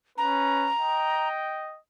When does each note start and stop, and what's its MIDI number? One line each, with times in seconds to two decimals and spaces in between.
0.18 0.68 61
0.18 0.68 71
0.18 1.28 82
0.78 1.77 75
0.78 1.77 79